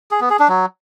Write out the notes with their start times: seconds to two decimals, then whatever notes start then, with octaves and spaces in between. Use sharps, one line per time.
0.11 G#4
0.21 B3
0.30 G#4
0.39 D4
0.49 F#3